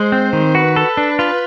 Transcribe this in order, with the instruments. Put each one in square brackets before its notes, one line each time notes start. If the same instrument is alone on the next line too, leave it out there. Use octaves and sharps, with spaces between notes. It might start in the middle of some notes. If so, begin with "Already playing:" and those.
Already playing: [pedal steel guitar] G#3 [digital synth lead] C5
[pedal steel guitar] C4
D#3
[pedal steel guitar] F#4 [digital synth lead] B4
[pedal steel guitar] A4
D4
[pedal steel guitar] F4 [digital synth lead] B4